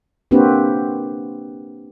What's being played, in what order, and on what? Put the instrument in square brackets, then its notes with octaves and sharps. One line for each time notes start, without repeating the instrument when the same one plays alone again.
[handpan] A#3 C4 D4 F#4 G4 B4